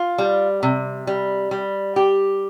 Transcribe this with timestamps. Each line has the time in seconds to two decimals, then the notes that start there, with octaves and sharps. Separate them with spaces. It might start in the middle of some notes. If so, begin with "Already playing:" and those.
Already playing: F4
0.18 G3
0.63 C3
1.07 G3
1.51 G3
1.96 G4